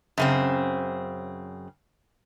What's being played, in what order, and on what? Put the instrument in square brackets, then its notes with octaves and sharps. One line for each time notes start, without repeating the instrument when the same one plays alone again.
[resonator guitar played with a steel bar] F#2 C#3 C4